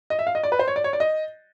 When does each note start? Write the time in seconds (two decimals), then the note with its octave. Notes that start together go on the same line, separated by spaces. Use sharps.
0.10 D#5
0.19 E5
0.27 F5
0.35 D#5
0.43 D5
0.52 B4
0.59 C5
0.68 C#5
0.76 D5
0.84 C#5
0.93 D5
1.00 D#5